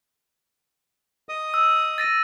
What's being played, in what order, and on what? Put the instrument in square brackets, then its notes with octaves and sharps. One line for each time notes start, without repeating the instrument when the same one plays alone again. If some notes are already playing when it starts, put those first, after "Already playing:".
[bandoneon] D#5 D#6
[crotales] E6
A6 A#6 D#7